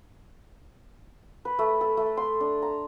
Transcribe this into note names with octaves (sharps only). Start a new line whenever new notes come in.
B4
A3
A4
A3
C6
D4
A#5